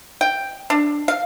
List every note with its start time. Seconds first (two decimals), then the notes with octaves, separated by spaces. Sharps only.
0.21 G5
0.70 D4
1.08 F5